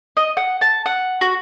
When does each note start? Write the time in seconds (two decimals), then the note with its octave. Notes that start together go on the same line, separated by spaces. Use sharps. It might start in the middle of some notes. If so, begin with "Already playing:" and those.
0.17 D#5
0.37 F#5
0.61 A5
0.86 F#5
1.21 F#4